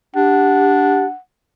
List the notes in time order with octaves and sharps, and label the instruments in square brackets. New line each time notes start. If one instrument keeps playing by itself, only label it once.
[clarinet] D4 [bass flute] G4 [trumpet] F#5